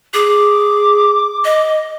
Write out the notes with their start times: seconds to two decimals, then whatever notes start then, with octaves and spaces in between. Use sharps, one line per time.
0.14 G#4 D6
1.44 D#5